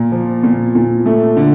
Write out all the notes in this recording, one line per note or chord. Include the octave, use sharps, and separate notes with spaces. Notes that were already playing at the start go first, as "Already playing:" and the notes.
Already playing: A#2
F3
A#2
A#2
A3
D3